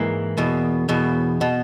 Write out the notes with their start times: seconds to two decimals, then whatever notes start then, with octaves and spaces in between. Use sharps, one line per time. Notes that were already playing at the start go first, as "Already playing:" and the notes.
Already playing: G#2 E3 A#3
0.37 E2 B2
0.89 E2 B2
1.41 B2